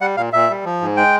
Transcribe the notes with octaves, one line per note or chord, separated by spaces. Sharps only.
G3 F#5
A#2 F5
A#2 E5
G3
F3
G#2
G#3 G5